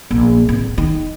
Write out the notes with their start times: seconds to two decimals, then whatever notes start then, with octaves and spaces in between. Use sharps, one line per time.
0.11 A#1
0.49 D1
0.78 D#3